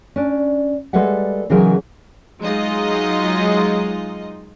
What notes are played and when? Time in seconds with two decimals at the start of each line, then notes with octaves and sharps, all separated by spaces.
0.16 C#4 D4
0.93 G3 G#3 A4 B4 E5 F#5
1.50 C#3 E3 F#3 G#3 D#4 A#4
2.41 F#3 G#3 D#4 F4 D#5